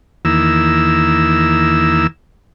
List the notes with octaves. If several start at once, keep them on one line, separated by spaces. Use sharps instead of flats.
E2 D#3 A#3 E4 E6